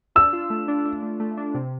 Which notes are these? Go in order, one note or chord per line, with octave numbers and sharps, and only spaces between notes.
D4 E6
F4
A3
D4
D4
A3
A3
D4
C3